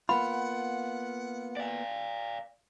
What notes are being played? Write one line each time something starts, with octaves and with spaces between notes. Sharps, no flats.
A#3 B3 F4 F#5 B5
D5 F5